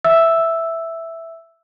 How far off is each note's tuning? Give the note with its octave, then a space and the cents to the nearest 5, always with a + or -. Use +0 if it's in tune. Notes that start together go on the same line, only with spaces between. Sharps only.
E5 +0 E6 +0